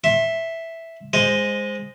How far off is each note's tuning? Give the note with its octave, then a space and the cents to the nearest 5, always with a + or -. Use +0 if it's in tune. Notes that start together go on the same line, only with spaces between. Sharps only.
E5 +0 C6 +35
G#3 -10 C5 +0 D#5 +0